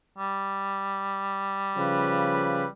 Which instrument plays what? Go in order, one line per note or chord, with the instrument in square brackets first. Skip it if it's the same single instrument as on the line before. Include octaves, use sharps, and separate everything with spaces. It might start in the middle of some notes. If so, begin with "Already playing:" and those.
[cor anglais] G3
[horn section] C#3 F3 B4